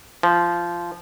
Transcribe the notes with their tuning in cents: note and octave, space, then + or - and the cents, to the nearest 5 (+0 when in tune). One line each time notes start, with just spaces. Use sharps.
F3 -15